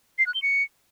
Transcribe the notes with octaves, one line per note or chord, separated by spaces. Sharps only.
C7
F#6
G7
C#7